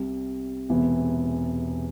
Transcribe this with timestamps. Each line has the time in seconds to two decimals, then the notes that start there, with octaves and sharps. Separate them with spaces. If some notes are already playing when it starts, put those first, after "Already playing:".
Already playing: C2 C3 G3
0.69 E1 E2 C3 E3